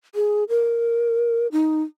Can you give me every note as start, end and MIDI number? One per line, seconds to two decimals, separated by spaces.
0.15 0.44 68
0.49 1.47 70
1.52 1.82 63